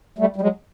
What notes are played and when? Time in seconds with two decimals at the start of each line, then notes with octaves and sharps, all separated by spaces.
0.18 G3 A3
0.36 G3
0.41 F#3 G#3